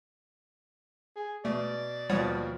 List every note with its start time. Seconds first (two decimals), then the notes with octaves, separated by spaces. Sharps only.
1.16 G#4
1.45 B2 A3 D5
2.10 D#2 B2 F3 G3 C#5 F#5